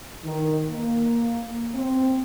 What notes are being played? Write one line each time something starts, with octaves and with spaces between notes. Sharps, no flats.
D#3
A#3
C4